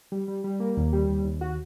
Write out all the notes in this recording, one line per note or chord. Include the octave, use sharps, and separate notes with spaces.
G3
G3
G3
A#3
D#2
G3
D#2
D#2
F#4